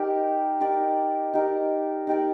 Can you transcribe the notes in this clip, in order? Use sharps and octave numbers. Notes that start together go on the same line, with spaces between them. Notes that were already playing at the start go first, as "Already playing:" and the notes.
Already playing: D#4 G4 A#4 D5
D#4 G4 A#4 D5
D#4 G4 A#4 D5
D#4 G4 A#4 D5